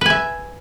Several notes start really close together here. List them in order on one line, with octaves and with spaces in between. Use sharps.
B4 G#5 E5